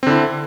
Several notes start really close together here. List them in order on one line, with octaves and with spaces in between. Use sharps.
C4 D3 E4